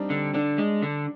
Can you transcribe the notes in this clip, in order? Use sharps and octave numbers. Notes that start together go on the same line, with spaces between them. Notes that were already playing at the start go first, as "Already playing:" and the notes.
Already playing: G3 C4 D4 D#4
D3
D3 D4
G#3
D3